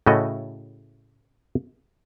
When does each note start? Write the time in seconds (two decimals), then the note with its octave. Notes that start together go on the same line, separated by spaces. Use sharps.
0.06 A2 C#3 A3 E4 F#4 D#5